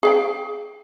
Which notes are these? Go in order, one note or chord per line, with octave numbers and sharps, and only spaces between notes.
G#4 F5 G5